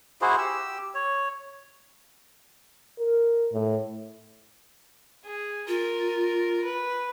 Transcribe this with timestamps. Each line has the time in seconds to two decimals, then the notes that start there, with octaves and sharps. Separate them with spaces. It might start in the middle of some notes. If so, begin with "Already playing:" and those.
0.21 E4 F#4 G#4 C5
0.38 G4 E6
0.95 C#5
2.99 A#4
3.53 A2
5.24 G#4
5.68 F4 A#4
6.64 B4